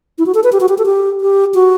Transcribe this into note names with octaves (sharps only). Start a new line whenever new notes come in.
E4
F#4
A4
B4
G4
F#4
G4
A4
G4
G4
F#4